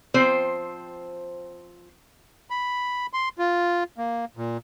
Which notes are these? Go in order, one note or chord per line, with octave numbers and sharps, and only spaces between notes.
F3 C4 C5
B5
C6
F4
A#3
A#2